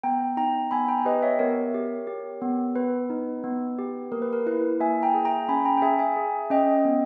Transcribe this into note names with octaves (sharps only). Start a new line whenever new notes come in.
B3 G5 A#5
D#4 G5 A#5
B3 G#5 B5
G5 A#5
G4 B4 D#5
C#5 E5
B3 A#4 C#5
G4
G4
B3
B3 B4
D#4
B3
G4
A#3 A#4
B4
A#4
E4 B4
A#3 E5 G#5
G5 A#5
G#4
G5 A#5
C#4 G#5 B5
G5 A#5
G5
G#4 E5 G#5
E5 G#5
G#4
C#4 D#5 G5
B3